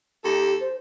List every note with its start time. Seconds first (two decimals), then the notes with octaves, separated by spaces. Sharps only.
0.24 D#2 G4 A4
0.60 C5